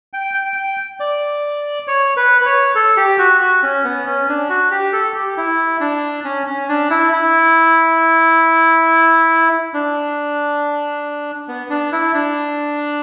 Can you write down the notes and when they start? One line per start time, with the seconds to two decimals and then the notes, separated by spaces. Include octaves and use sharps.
0.13 G5
0.34 G5
0.56 G5
1.00 D5
1.88 C#5
2.17 B4
2.41 B4
2.46 C#5
2.75 A4
2.97 G4
3.18 F#4
3.41 F#4
3.63 C#4
3.84 B3
4.06 C#4
4.28 D4
4.49 F#4
4.71 G4
4.93 A4
5.15 G4
5.37 E4
5.81 D4
6.25 C#4
6.47 C#4
6.69 D4
6.90 E4
7.12 E4
9.74 D4
11.48 B3
11.70 D4
11.92 E4
12.14 D4